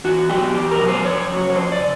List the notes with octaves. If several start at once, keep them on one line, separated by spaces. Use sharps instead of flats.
E2 F#4
B2 F#3 G4
E2 G4
A#4
B2 F#3
C5
F2 C#5
C#3 F#3
C#5
F2 C5
D5
C#3